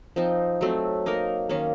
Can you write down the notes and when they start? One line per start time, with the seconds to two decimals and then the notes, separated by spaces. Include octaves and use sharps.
0.16 F3 C4 D#4
0.61 F#3 A3 C4
1.06 A#3 D#4 A#4
1.49 D#3 A#3 C#4